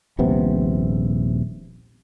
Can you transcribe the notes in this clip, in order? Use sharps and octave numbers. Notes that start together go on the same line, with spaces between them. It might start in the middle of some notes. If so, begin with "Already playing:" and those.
D#1 A#1 C3 B3